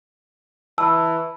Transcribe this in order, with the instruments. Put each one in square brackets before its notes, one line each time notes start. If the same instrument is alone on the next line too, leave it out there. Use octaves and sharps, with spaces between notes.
[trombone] E3 [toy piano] A5 B5 [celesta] E6